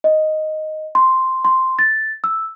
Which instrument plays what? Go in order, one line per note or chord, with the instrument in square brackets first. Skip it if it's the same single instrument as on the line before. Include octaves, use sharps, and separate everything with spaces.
[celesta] D#5
C6
C6
A6
E6